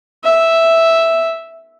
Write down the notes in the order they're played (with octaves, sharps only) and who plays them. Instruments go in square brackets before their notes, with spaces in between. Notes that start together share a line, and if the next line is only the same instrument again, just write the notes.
[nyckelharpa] E5